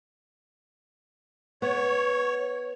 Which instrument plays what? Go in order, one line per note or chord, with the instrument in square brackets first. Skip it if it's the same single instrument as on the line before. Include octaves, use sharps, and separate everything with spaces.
[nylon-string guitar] B3 [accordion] C#5